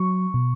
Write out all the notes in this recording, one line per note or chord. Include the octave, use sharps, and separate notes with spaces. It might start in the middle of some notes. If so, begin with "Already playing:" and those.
Already playing: F#3 C#6
B2